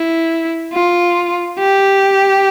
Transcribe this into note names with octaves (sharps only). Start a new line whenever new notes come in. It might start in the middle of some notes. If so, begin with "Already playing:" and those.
Already playing: E4
F4
G4